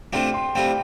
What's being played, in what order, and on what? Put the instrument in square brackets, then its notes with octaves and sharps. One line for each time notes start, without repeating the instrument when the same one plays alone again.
[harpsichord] C3 A3 D4 F4 [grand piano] G5
[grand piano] C6
[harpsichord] A2 G3 C4 F4 [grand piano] G5